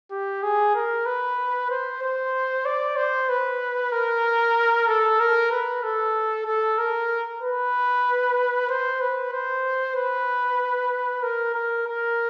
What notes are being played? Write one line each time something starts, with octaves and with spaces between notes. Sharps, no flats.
G4
G#4
A#4
B4
C5
C5
D5
C5
B4
A#4
A4
A#4
B4
A4
A4
A#4
B4
C5
B4
C5
B4
A#4
A#4
A#4